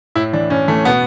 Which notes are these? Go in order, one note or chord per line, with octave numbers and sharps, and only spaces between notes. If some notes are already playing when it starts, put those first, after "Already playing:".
A2 E4
E3 D4
A2 C#4
E3 A3
B2 B3